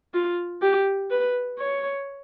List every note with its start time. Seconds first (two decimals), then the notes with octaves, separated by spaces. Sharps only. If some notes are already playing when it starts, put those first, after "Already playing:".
0.14 F4
0.62 G4
1.11 B4
1.59 C#5